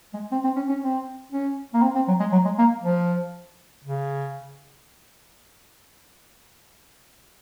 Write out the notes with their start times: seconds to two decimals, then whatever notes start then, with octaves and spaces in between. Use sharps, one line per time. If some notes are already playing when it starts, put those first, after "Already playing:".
0.14 G#3
0.32 C4
0.44 C4
0.56 C#4
0.69 C#4
0.82 C4
1.32 C#4
1.74 A#3
1.82 C4
1.96 C4
2.08 F#3
2.20 G#3
2.32 F#3
2.45 G#3
2.58 A#3
2.84 F3
3.84 C#3